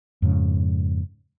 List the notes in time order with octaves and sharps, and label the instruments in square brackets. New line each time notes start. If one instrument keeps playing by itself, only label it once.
[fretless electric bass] F2 G#2 C#3